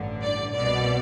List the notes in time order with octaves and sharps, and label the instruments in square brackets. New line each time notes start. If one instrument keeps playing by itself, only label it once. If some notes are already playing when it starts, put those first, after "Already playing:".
Already playing: [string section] A1 G2 D3
D5
C2 B2 D5